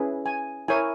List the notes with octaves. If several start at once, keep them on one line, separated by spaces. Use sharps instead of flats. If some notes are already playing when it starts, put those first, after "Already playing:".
Already playing: C#4 E4 G#4 B4
G#5
E4 A#4 C#5 G#5